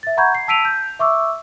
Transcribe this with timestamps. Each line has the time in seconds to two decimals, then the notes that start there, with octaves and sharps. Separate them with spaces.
0.03 E5 A6
0.17 F#5 A#5 B5 C#6 G6 G#6
0.35 C7
0.48 A5 E6 B6 D7 D#7 F7
0.65 G6
0.99 E5 C#6 D6 E6